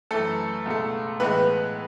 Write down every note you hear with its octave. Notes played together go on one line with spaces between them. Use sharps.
F#2 E3 A3 A4
C#2 B2 A3
A2 E3 G#3 B3 B4